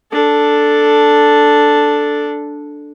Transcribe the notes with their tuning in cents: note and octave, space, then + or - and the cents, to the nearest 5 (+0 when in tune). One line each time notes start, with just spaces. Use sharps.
D4 +0 A4 +0